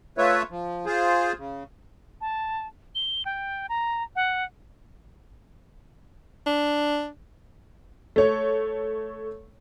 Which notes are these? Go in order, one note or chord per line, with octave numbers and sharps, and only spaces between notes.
A3 F4 B4 C#5 E5
F3
F4 G#4 C5
C#3
A5
G7
G5
A#5
F#5
D4
A3 C#5